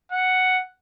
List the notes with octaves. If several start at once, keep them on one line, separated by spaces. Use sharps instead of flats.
F#5